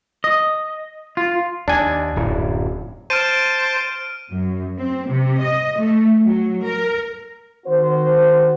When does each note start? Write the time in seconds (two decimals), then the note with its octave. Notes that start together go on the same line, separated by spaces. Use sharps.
0.24 D#5
1.17 F4
1.68 D#2 D4 G#5
2.16 D1 F#2
3.10 C5 A5 F6 D7 D#7
4.30 F#2
4.78 C4
5.09 C3
5.43 D#5
5.78 A3
6.22 F#3
6.64 A#4
7.66 D#3 C4 F#4 C5